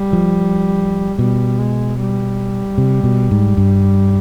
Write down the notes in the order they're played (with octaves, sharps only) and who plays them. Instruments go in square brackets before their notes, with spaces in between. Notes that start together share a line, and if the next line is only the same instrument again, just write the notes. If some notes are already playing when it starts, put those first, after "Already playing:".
Already playing: [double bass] G3
[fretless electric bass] F3
[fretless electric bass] B2 [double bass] G3
[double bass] G#3
G3
[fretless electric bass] C3
B2
G#2
G2